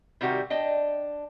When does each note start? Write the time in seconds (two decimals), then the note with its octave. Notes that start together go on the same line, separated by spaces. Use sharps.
0.21 C3 D#3 G3 F#4 G4 A#4
0.50 D4 D#5 G5